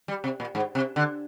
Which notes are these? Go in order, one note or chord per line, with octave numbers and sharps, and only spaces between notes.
G3
C3
A#2
G#2
C3
D3